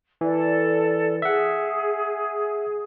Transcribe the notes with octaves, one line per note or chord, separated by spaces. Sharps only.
E3 A4 D5
G#4 E5 F#5